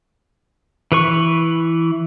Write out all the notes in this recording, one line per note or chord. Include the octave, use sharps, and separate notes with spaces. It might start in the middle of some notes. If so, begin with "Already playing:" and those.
E3 B4 C#6